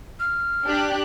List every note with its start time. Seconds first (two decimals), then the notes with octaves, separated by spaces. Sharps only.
0.20 F6
0.67 D4 G4 F#6